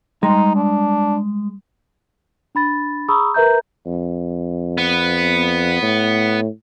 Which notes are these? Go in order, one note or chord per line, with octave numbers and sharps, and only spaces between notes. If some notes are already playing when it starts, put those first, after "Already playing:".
G3 G#3 D#4 C6
D4
D4 B5 A6
G#4 A#5 B5 C#6 D#6 E6
A#4 B4 E5 A#5 G6
F2
B3
A2